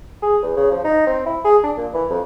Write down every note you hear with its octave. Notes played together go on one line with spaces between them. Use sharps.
G#4
E2
C#3
F3
D#4
C4
E4
G#4
D4
A#2
E3
F2